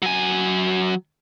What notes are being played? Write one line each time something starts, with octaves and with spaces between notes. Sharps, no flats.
F#3 G#5